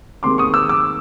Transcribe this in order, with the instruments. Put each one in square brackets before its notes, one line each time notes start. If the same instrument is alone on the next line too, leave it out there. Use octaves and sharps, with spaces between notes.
[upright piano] D#2 D#3 G#3 C4 C6 D6
C#6 D#6
D6 E6
D6 E6